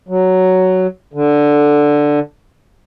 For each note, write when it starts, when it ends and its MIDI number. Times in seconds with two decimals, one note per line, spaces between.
0.09 0.87 54
1.13 2.19 50